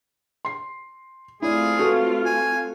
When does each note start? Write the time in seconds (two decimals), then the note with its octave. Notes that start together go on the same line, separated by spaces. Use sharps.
0.45 C6 C7
1.42 A3 C4 E4 F4 G#4 D5
1.79 F#4 A4 B4
2.25 G#5